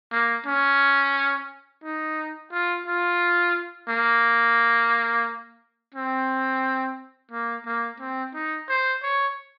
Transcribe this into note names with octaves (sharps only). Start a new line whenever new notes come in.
A#3
C#4
D#4
F4
F4
A#3
C4
A#3
A#3
C4
D#4
C5
C#5